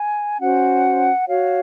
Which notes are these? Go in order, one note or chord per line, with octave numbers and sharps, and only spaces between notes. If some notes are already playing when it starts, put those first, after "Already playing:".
Already playing: G#5
C#4 F#4 C5 F#5
F#4 C#5 F5